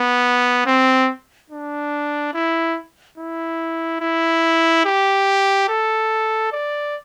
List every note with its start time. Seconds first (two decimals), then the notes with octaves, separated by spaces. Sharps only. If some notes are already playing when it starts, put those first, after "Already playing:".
Already playing: B3
0.66 C4
1.50 D4
2.34 E4
3.18 E4
4.01 E4
4.85 G4
5.68 A4
6.52 D5